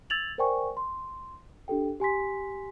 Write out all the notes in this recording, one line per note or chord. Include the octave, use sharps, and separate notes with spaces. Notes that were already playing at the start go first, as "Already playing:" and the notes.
E6 G#6 A6 F7 F#7
A#4 C5 D5 G5 G#5 C#6
C6
D4 G4 A4 G5
G4 G#5 C6 B6